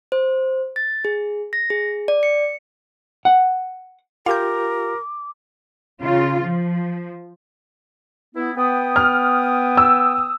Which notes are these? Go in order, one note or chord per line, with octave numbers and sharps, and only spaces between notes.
C5
A6
G#4
A#6
G#4
D5
C#7
F#5
F4 G4 A#4 F5 D6 G6
C#3 F4
F3
B3 E4
B3 G5 D#6
F6
E6